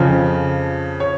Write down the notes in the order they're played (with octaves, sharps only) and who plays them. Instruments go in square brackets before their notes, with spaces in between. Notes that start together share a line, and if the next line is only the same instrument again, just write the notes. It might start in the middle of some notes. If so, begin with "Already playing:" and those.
Already playing: [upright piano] F2 C#3 F3
C#5